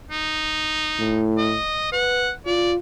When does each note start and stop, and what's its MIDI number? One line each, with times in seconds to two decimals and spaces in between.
0.11 1.25 63
0.99 1.57 45
1.38 1.88 75
1.92 2.31 71
1.92 2.31 78
2.46 2.77 65
2.46 2.72 74